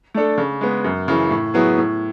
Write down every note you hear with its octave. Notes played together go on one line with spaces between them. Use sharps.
A3 D4 A4
C#3
G#3 B3
F#2
C#3 E3
A2
F#3 B3 E4 G#4
A2